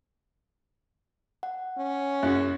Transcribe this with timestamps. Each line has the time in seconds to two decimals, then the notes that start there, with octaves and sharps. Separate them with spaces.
1.43 F#5
1.78 C#4
2.23 F#2 F#4 G#4 F#6